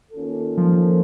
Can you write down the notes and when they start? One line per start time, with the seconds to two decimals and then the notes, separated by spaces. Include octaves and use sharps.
0.12 D#3 A#3 C#4 F4 A4
0.58 F3